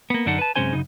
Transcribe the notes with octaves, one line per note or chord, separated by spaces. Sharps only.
A#3 B3
F#2 D3 D4 D#4 F#5
B4 A5
F#2 C3 G#3 C#4 C5 G#5
F#2 C#3 D#4